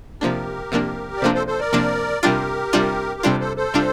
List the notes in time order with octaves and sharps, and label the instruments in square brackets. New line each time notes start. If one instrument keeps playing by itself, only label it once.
[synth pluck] C3 F3 A#3 D4 [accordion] G4 A#4
[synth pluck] C3 F3 A#3 D4
[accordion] D5
[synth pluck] C3 F3 A#3 D4 [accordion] A4 C5
[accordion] A4 C5
A4 C5
A#4 D5
[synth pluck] C3 F3 A#3 D4
[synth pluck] C3 G3 D4 F4 [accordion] G4 A#4
[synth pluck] C3 G3 D4 F4
[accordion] A#4
[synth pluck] C3 G3 D4 F4 [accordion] A4 C5
[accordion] A4 C5
A4 C5
[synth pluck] C3 G3 D4 F4